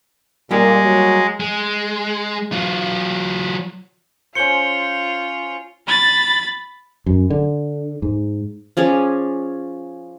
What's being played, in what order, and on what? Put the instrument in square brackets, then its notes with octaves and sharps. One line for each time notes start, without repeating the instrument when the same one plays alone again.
[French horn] A#2 [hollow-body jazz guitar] G3 A#3 G4 [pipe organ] G#3
[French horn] F#3
[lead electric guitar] G#3
F#3 F4
[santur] C#4 C5 [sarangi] F4 [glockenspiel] C#7 G7
[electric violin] B5 A6
[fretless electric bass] F#2
D3
G#2
[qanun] F3 C#4 G#4 D5